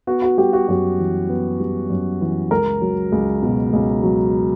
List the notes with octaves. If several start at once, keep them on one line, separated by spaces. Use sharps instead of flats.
B3 F#4
F#4
G3 G4
F#4
F#2 G4
E3
B3
G3
F#2
E3
C#2 A#4
F#3
C#2
B2
C#2
F#3